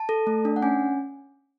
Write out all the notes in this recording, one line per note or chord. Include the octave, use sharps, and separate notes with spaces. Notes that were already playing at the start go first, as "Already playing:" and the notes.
Already playing: A5
A4
A3
D4
F#5
C#4 G#5